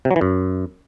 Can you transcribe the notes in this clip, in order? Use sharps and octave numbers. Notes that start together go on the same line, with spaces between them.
C3
F#3
E3
F#2